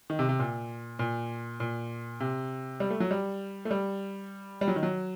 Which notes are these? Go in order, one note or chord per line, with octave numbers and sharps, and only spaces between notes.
D#3
C3
C3
A#2
A#2
A#2
C3
G3
A3
F#3
G3
A3
G3
G3
F#3
D#3
F#3